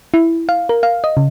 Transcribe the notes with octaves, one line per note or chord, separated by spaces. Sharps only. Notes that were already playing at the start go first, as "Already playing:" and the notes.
E4
F5
A#4
F5
D#5
C#3